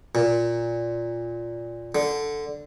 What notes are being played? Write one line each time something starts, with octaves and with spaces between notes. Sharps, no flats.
A#2
D3